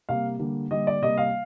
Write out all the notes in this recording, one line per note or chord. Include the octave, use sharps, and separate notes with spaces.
C3 G3 A#3 F5
D3 G3 A#3
D3 G3 A#3 D#5
D5
C3 G3 A#3 D#5
F5